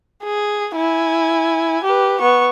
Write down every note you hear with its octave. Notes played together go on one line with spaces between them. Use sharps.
G#4
E4 G#5
G4 B4
B3 C#6